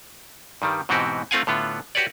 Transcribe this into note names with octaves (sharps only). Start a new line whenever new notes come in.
G2 D#3 G3
G#2 B2 E3 C4 F#4 G4
A3 C4 F4 F5 F#5 G#5
A2 D3 B3 F4
F#4 G4 B4 C#5 D5